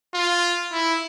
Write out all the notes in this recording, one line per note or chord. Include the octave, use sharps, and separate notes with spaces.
F4
E4